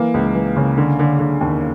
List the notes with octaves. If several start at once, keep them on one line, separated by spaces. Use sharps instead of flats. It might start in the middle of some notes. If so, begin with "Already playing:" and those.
Already playing: E3 A#3
C#2
E3
C#3
D3
D3
D3
D#2